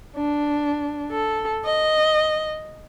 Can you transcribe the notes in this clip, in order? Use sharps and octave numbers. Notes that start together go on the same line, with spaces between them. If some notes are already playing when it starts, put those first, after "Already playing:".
D4
A4
D#5